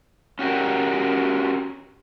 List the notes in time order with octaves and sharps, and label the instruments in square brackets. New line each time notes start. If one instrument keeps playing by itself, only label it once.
[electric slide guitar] C#4 F#4 G4 A#4